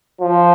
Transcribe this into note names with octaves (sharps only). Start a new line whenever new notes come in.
F3